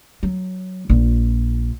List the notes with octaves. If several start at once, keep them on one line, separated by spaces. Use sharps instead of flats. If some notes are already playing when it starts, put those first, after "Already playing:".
F#3
A#1 F4